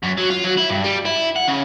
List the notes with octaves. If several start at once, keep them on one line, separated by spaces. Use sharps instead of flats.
F#2
F#3
F4
F#3
E4
G2
G3
E4
F#5
C#3